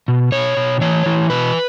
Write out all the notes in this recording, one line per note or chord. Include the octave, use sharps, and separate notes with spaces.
B2
B2 C#5
B2
E3 C#5
E3
B2 B4